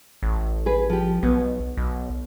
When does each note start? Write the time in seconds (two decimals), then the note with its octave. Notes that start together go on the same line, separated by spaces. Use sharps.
0.23 A1
0.66 G#4 B4
0.90 F3 G4
1.23 B1 B3
1.77 B1